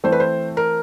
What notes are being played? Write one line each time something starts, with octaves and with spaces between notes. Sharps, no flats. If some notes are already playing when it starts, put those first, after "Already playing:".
E3 A3 C4 C5
B4
C5
A#4